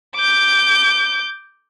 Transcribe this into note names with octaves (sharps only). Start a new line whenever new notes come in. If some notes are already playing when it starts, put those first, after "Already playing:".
D6 G6